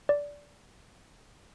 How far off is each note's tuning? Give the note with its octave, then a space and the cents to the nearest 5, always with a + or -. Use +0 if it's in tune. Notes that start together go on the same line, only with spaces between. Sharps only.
D5 -15